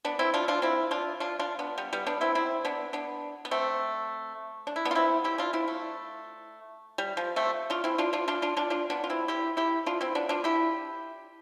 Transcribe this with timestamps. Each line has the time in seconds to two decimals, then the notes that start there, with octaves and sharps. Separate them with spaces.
0.05 B3 D4
0.19 C4 E4
0.34 D4 F4
0.48 D4 F4
0.62 C4 E4
0.91 D4 F4
1.20 D4 F4
1.39 D4 F4
1.59 B3 D4
1.78 G3 B3
1.93 G3 B3
2.06 B3 D4
2.21 C4 E4
2.35 C4 E4
2.65 B3 D4
2.93 B3 D4
3.45 B3
3.51 A3 C4
4.67 D4
4.76 E4
4.85 B3 D4
4.91 F4
4.95 C4 E4
5.24 E4 G4
5.38 D4 F4
5.53 C4 E4
5.68 A3
6.98 G3
7.17 F3
7.36 A3 C4
7.70 D4 F4
7.84 C4 E4
7.98 D4 F4
8.13 D4 F4
8.28 D4 F4
8.42 D4 F4
8.57 D4 F4
8.70 D4 F4
8.90 B3 D4
9.04 F4
9.10 C4 E4
9.28 E4 G4
9.57 E4 G4
9.86 D4 F4
10.01 C4 E4
10.15 B3 D4
10.29 D4 F4
10.44 E4 G4